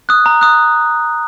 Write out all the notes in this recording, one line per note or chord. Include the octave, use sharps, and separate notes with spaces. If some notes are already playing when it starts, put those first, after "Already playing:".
D#6 F#6
A#5
D#6 F#6